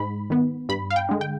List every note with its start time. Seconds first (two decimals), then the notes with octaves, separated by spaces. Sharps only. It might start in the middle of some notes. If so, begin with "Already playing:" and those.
Already playing: G#2 B5
0.30 D#3 B3
0.69 G2 B5
0.90 F5
0.96 G5
1.09 D3 G#3
1.21 G5